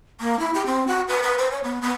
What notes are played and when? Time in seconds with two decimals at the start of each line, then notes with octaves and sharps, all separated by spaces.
0.21 A#3
0.39 E4
0.54 G4
0.66 C4
0.87 F#4
1.08 B4
1.23 B4
1.38 C5
1.51 C#5
1.64 B3
1.82 B3